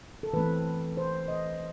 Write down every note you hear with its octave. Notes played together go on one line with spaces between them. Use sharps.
A4
E3 A3 C4 B4
C5
D#5